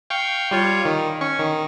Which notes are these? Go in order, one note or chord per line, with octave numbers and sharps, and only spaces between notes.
F5 G5 C#6
G3 F4 C#5
D#3
C#4 C#6
D#3